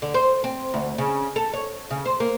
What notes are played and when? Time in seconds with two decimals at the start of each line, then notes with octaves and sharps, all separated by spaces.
0.02 D3
0.14 C5
0.44 C4
0.74 D2
0.98 C#3
1.36 A4
1.53 C#5
1.91 C#3
2.06 C5
2.20 A#3